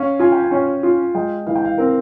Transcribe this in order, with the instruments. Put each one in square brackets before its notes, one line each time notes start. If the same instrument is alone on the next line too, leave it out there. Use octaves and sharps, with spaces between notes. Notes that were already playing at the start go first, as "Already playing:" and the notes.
Already playing: [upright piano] C#4 [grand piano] F5
[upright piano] F4 [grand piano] G#5
[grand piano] G5
G#5
[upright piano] C#4
F4
[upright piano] G#3 [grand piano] G5
[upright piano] E3 [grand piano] F5
[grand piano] G5
F5
[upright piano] C4 [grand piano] A#4